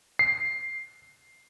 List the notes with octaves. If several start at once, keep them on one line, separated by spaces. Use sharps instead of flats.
C7